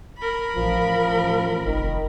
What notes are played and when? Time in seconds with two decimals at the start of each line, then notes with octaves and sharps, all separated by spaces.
0.18 A#4 B5
0.57 A1 F3
1.65 F1 D#3